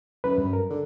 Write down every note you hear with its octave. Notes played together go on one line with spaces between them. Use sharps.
F#2 B4
G2
A#4
D3